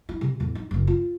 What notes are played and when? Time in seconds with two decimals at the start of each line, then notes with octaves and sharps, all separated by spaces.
0.09 E4
0.21 C3
0.40 E2 A2
0.55 D#4
0.71 F#1 C#4
0.87 F4